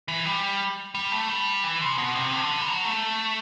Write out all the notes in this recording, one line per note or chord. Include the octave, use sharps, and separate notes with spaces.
E3
G3
G3
A3
G3
E3
C3
B2
C3
D3
G3
F#3
A3